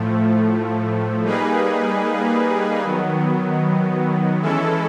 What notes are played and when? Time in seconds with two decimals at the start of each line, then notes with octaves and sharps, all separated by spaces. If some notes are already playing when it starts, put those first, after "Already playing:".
Already playing: A2 F3 A3
1.24 G3 A#3 D#4 G#4 B4
2.82 D#3 F#3 B3
4.40 E3 G#3 C#4 E4 A4